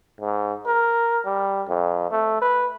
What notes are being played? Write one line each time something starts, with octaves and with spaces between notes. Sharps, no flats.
G#2
A#4
G3
F2
A3
B4